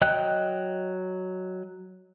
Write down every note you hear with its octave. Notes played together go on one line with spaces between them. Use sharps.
F#3 D#5 G5 F#6